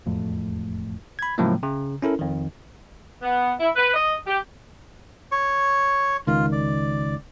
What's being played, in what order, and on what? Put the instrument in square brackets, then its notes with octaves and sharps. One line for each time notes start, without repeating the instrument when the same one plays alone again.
[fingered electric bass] E1 F2 A2
[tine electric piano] B5 G#6
A2 C#3 F3 F#3 G#3 A#3
C#3
C#4 E4 A4 A#4
F2 D#3
[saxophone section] B3
E4
B4
D#5
G4
[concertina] C#5 C#6
[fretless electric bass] C#2 D#3 [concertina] F4
[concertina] D5